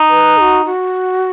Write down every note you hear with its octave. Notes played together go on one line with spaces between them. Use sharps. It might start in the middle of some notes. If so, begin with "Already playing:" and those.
Already playing: D#4
B4
G#4
F#4
F#4